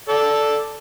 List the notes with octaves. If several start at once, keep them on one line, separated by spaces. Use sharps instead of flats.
A4 D5